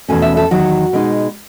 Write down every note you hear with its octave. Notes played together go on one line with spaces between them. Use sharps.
E2 B2 A3 C#4 G#5
E5
A4
E2 D#3 F#3 F#4
B2 G#3 D#4